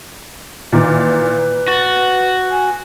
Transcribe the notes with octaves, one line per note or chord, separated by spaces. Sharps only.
A#2 D#3 E3 B4
F#4 A6
G#5